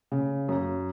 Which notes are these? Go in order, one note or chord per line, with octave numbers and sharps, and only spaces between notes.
C#3
F#2